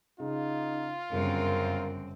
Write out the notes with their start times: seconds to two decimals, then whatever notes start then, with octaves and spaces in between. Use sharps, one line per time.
0.20 C#3 D#4 F4
1.11 G1 F#2 C#3 C4 A#4